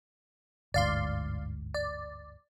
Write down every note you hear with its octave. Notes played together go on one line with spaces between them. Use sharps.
G1 D2 G#2 D5 F5 C6
D5